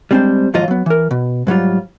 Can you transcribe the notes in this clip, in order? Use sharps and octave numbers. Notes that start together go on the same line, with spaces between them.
G3 G#3 C4 D4 C5
D#2 G#2 F3 F#3 F4 D#5
F#3 B3
E3 A#4
B2
G#2 F#3 G3 F4